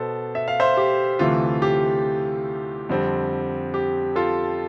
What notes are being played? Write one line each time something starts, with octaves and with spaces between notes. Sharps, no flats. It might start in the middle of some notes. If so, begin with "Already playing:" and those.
Already playing: B2 B3 A4 C5
E5
F5
C5 E5
G4
D2 C3 E3 A3 F4
G4
F2 D3 G3 C4
G4
F4 A4